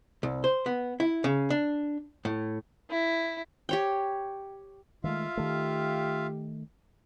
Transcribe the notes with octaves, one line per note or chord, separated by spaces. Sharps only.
C2
C5
B3
E4
C#3
D4
A2
E4
G4 C#5 G5
D#3 G#3 A3 F4 E5 F5
D#3 A3 G4